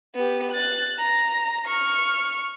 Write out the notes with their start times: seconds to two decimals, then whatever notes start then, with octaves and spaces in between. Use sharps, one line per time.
0.15 B3 G4
0.51 F#6 A6
0.99 A#5
1.67 C#6 F6